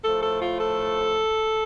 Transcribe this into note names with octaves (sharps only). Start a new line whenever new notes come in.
A2 F3 A3 A4
A4
F4
A4